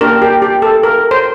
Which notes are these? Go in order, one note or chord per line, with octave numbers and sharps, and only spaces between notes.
A#3 D4 G4 A#4
G4
G4
A4
A#4
C5